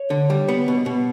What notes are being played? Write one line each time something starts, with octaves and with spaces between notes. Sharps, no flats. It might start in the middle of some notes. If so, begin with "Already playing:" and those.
Already playing: C#5
D3
G3
B3
B2
B2